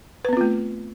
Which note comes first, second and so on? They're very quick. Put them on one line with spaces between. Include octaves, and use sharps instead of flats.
B4 B3 C4 F4 A3